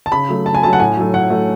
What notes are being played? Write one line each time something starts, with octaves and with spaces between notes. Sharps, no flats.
A5
C#3 B5
F#3 A3
C#3 A5
G#5
F#3 A3 A5
F#5
A2 G#5
F#3 A3
A2 F#5
F#3 A3